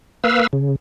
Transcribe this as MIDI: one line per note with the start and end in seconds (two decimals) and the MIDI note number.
0.24 0.47 58
0.24 0.47 71
0.24 0.47 77
0.24 0.47 88
0.53 0.76 49